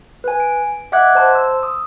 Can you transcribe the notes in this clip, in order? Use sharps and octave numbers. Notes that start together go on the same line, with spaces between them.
B4 G#5
D7
D#5 E5 F#5 D6 F#6 G#6
C5 A5 C6
E6
D#6